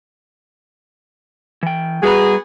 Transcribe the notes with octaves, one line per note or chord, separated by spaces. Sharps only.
E3 G5
G3 B3 F#4 G#4 B4 A#5